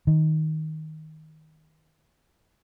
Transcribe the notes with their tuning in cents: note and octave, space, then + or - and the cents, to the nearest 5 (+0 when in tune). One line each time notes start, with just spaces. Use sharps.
D#3 +10